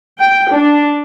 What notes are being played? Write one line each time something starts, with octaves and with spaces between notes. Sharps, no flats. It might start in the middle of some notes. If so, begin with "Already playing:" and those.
G5
D4